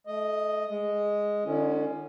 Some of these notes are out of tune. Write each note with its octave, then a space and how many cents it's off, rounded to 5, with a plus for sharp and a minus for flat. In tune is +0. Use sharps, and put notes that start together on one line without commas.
A3 -35 D#5 +0
G#3 +0 D#5 +0
D3 +35 C#4 +0 E4 +40